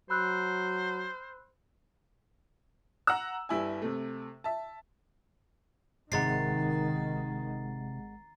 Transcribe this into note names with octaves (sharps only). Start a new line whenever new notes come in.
F#3 C5 B5 E6 F#6
F#5 A#5 E6
G1 G3 E4 G#5
C3 A3
E5 A5
G#1 C3 D#3 G#3 F#5 A#5 A6 C7